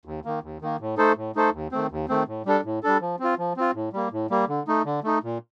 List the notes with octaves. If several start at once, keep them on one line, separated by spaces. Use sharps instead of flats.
D#2
D#3 A#3
D#2
D#3 A#3
A2
A3 D#4 A4 C5
A2
A3 D#4 A4 C5
D#2
D#3 A3 C4
D#2
D#3 A3 C4
A2
G3 D4 A4
A2
G3 D4 A4
F3
C4 F4
F3
C4 F4
A2
G3 A#3
A2
G3 A#3
D3
A3 D#4
D3
A3 D#4
A#2